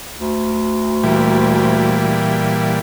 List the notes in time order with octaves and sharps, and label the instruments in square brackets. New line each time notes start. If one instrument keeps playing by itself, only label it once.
[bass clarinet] D2
[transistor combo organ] A#2 E3 G3